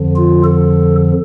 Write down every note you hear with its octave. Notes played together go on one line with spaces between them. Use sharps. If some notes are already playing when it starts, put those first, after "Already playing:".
Already playing: F2 D3 F3
F4
A4